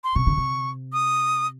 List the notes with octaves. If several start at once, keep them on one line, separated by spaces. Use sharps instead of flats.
C6
C3 C#6
C#3
C3
D#6